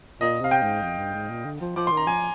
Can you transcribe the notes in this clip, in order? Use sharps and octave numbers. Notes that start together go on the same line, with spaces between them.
A#2 D#5
C3 F5
G5
G#2
F2
G2
G#2
A#2
D3
F3
F3 D6
C6
D#3
A#5
F3 G#5